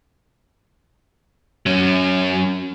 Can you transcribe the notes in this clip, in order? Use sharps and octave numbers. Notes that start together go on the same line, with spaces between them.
F#3 C#4